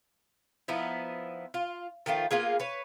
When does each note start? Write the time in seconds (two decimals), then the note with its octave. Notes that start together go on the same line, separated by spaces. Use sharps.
0.68 F3 B3 D#4 E4
1.54 F4
2.06 D#3 F3 A3 F4
2.31 A#3 B3 F4 G#4
2.60 B4 C#5